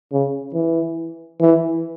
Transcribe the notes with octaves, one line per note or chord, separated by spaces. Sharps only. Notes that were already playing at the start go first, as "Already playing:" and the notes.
C#3
E3
E3